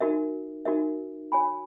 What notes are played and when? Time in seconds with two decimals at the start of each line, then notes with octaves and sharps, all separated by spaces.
0.01 D#4 F#4 A#4 E5
0.65 D#4 F#4 A#4 E5
1.32 F#4 C#5 G#5 B5